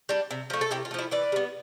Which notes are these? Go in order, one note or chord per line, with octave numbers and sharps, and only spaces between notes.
G3 D4
C3
F3 A3
A4
C3 E4 G4
F4
A3
F3 E4
E3 B4 D5
G3 B3